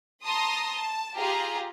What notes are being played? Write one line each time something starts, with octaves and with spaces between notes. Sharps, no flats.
A5 A#5 C6 D#6
A5
F4 G4 G#4 F5 A#5